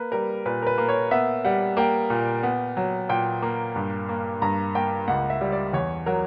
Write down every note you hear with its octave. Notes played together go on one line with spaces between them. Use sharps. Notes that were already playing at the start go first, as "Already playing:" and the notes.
Already playing: A#3 B4
G3 A#4
A#2 B4
A#4
B4
A#3
C#5
B3 E5
G3 F#5
A#3 G5
A#2
B3
F#3
A#2 G5
A#3
G2
A#3
G2 A#5
A#3 G5
C#2 F#5
E5
G3
D5
E2 C#5
F#3 A#4